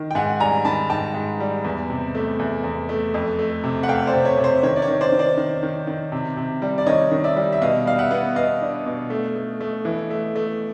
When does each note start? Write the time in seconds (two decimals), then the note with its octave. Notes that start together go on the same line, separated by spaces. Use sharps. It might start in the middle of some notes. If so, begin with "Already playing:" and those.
Already playing: D#3
0.11 G5
0.15 G#2 F#5 G#5
0.40 G3 G#5 A#5
0.65 D#3 A5 B5
0.90 G#2 G5 A5
1.14 G#2
1.40 G3
1.65 E2
1.90 C3
2.15 A3
2.39 E2
2.64 E2
2.89 A3
3.14 F2
3.39 A3
3.64 C3
3.83 F#5
3.88 A3 F5 G5
4.07 C5 D5
4.13 C3
4.25 C#5
4.38 C3
4.44 C5
4.63 D#3 C#5
4.76 D5
4.82 C#5
4.88 D#3
5.01 C5 D5
5.12 D#3
5.19 C5 D5
5.38 D#3
5.63 D#3
5.87 D#3
6.12 C3
6.37 C3
6.62 G3
6.78 D5
6.86 D#3 C#5 D#5
7.12 D#3
7.24 D5 E5
7.36 G3
7.52 E5
7.62 B2 D#5 F5
7.86 G3 F5
7.99 E5 F#5
8.11 B3
8.36 B3 D#5 F5
8.61 D4
8.86 B2
9.10 A3
9.36 A3
9.61 A3
9.85 E3
10.11 A3
10.35 A3